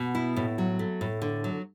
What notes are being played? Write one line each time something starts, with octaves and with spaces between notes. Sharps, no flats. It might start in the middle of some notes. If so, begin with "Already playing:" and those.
Already playing: B2
E4
A2
F#3
A3
A2
D3
F#3